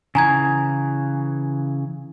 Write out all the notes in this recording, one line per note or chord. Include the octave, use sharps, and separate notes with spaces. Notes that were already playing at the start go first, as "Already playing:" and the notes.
C#3 E3 G#5 A#5 G#6